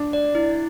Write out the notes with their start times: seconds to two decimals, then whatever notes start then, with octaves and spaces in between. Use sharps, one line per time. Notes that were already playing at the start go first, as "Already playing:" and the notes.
Already playing: D4
0.13 D5
0.35 E4